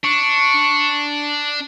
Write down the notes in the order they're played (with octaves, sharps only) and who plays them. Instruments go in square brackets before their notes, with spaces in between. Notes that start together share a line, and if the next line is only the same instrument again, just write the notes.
[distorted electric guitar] D4 [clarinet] C#6